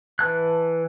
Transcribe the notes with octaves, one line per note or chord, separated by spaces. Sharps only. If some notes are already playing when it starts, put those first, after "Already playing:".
E3 B4 A5 F#6